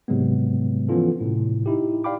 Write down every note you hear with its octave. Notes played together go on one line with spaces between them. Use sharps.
G#2 C3 F#3 G#3 B3
E3 F3 B3 C#4 F4 A4
A2 C3
D#4 E4 G4
D5 F5 G5 B5 D6